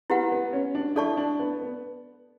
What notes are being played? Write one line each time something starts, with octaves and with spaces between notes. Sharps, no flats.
B3 E4 G4 B4 F#5
B3
C#4
D4
E4 A4 D5 A5 C#6
D4
B3
B3